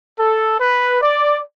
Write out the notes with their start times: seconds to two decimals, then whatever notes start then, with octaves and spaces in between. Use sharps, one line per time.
0.16 A4
0.58 B4
1.00 D5